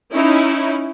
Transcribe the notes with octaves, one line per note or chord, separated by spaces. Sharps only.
C#4 D#4 E4